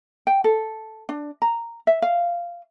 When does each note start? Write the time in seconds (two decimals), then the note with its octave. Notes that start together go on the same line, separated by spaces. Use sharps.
0.27 G5
0.44 A4
1.09 D4
1.42 A#5
1.87 E5
2.02 F5